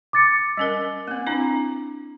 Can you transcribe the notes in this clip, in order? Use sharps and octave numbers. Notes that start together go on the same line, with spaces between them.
D6 A6 C#7
G3 C#4 A#4
A#3 C4
C4 D4 E4